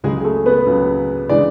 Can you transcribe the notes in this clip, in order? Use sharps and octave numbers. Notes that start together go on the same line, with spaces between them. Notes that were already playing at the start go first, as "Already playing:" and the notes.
C#2 C#3 F#3 G#3 G#4
G#4
A3 A4
B3 B4
C#2 C#3 F#3
C#3 E3 G#3 D4 D5